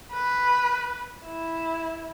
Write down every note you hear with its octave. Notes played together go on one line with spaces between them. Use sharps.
B4
E4